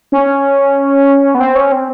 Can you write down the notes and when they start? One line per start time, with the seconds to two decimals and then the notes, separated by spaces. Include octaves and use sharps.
0.12 C#4
1.35 B3
1.40 C4
1.55 C#4
1.72 C4